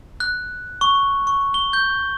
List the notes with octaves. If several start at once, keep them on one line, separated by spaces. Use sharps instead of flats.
F#6
C#6
C#6
G7
G6